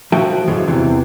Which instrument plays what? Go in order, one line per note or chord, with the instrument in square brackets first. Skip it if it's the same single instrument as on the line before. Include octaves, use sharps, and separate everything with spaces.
[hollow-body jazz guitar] F3 F#4 E5 F#5 G5 A5
F#2 D3 E3 F3 G#3
E2 C3 E3